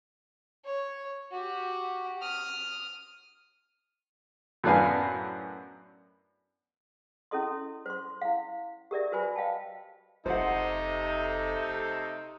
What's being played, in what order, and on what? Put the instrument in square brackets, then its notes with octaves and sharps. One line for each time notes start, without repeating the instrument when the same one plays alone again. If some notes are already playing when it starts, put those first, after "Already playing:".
[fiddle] C#5
F#4 G4
D#6 F6
[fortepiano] F#2 A2 B3 D4 F5 G#5
[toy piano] C#4 E4 A4 D#5 C6
C5 C6
E4 F5
G4 A#4 D5 E5
F#4 B4 C5 G#5 B5
D#5 F5 G5 A5
[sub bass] F1 [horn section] C3 A3 [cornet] D#4 [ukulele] C5 F#5